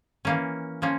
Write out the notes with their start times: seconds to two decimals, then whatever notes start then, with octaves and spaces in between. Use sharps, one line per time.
0.25 E3 A#3 C#4
0.82 F3 A#3 C#4